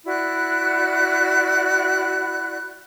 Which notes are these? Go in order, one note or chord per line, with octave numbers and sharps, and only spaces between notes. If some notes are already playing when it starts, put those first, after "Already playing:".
E4 F#4 D5 F#6